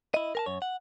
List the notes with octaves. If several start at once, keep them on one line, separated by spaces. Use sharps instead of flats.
E4 D#5
A#4 G#5 A5
F#2 C#5
F#5